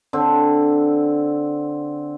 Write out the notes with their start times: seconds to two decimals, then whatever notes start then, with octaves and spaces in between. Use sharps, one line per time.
0.13 D3 C4